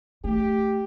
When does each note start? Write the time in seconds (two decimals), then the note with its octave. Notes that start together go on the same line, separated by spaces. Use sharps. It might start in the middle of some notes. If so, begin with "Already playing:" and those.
0.24 A3 G4